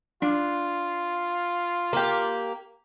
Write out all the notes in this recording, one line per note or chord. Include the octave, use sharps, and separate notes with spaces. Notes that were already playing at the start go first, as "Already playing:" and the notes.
D4 F4
A#3 G4